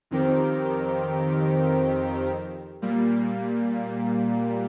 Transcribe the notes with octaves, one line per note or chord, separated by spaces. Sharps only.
F2 D#3 C4 G4 A#4
A#2 G3 A#3